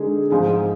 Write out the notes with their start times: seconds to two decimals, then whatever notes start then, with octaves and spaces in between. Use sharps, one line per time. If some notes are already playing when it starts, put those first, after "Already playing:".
Already playing: D3 G#3 D#4 G#4
0.30 G#2 F3 G#3 D#4 G#4